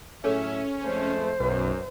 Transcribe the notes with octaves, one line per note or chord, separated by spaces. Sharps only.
A2 F#3 C#4 G#4 A4 C#5 E5
F2 G#3 A3 C5
B1 F#2 B4